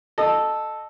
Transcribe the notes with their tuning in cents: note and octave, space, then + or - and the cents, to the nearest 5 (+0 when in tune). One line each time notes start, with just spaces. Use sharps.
A4 -5 D#5 -20